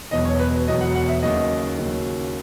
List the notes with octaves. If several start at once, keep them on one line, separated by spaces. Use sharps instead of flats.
E1 E2 B2 F#3 D#5
C#5
B4
E1 E2 B2 F#3 D#5
F#5
F#5
E5
D#2 C#3 F#3 D#5
D#2 C#3 F#3